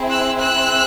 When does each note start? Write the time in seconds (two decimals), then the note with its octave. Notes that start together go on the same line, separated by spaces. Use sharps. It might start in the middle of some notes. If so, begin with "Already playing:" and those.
Already playing: C4 E4 G#4
0.09 E6 F#6
0.38 E6 F#6